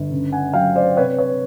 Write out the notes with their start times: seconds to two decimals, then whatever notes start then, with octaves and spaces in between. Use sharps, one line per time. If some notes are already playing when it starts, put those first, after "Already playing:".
Already playing: G1
0.11 C#3
0.32 F#5 G#5
0.54 F#3 F5 G5
0.76 C5 D5
0.96 C3 B4 C#5
1.18 B4 C#5